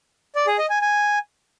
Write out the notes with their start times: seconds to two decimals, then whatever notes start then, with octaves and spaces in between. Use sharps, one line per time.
0.35 D5
0.47 G#4
0.58 D#5
0.70 G#5
0.81 G#5